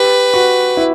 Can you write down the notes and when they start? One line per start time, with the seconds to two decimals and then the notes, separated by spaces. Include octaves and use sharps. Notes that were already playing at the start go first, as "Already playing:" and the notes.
Already playing: G4 B4
0.34 F#4
0.77 E4